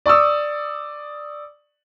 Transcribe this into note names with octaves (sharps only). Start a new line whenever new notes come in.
D5 C#6 D#6 E6